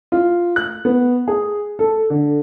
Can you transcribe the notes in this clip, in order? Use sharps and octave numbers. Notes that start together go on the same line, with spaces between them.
F4
F#6
B3
G#4
A4
D3